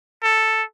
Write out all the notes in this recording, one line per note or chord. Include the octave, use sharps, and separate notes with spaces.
A4